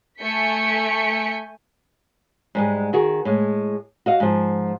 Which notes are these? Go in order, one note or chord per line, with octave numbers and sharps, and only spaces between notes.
A3 G#5 G6 B6 C#7
G#2 G3 G#3
D#3 F#4 G#4
A2 G#3
F#4 D#5 F5
G#2 F3